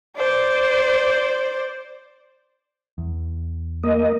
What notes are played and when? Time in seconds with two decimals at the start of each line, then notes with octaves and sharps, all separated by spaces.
0.17 C5 D5
2.98 E2
3.83 A#3 D#5